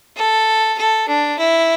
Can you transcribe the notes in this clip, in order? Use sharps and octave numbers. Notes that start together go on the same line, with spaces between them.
A4
A4
D4
E4